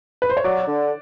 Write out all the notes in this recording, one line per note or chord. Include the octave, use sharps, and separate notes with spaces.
B4
C5
C#5
F#3 D5
D3